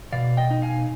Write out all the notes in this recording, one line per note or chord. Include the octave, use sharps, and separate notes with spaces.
B2 D5 F5
D#5 G5
D#4
F5 G#5